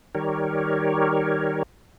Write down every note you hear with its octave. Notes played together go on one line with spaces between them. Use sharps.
D#3 G3 G4 A#4 C#5